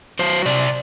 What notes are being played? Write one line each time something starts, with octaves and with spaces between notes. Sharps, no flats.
F#3 C5
C3 D5